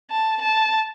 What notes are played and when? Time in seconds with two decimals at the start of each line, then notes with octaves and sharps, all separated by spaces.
0.11 A5
0.42 A5